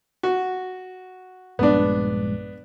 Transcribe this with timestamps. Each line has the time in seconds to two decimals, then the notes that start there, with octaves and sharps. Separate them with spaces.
0.23 F#4
1.59 A#1 G2 G#3 B3 D4